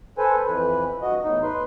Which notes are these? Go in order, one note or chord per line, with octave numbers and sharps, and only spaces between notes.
A4 B4 C5 G#5
F2 E3 B4
G2 F#4 D#5
E2 A2 D#4
B4 C6